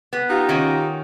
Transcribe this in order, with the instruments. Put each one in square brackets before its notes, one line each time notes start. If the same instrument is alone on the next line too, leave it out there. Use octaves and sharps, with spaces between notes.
[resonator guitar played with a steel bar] B3
[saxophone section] D#4 F4 G4
[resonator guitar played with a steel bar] D#3 C#4 F#4